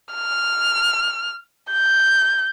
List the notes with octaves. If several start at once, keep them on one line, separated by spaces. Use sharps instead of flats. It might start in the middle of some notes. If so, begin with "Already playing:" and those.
F6
G6